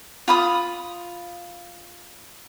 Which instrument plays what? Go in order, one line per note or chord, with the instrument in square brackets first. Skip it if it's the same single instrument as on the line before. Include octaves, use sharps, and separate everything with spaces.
[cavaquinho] F4 B5 D#6